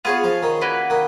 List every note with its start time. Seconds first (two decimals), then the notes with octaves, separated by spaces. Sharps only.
0.05 B3 F4 G#4 C#5
0.24 F3
0.43 D#3
0.61 A#3 C#4 F#4 B4
0.90 D#3